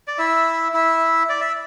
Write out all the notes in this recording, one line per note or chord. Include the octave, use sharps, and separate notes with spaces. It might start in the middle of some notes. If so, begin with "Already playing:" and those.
D5
E4 E5
E4 E5
D5
E5